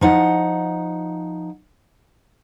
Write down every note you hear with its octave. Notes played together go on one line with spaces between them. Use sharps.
F3 D#4 F#5